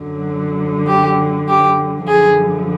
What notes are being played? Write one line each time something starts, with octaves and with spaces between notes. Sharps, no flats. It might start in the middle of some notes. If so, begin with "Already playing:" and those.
Already playing: F#2 D3 F#3
G4
G4
F#2 D3 F3 G#4